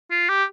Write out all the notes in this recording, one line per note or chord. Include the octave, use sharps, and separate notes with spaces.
F4
G4